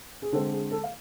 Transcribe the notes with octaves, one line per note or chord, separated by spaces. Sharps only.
G#4
D3 G#3 C4 A4
G#4
A4
F5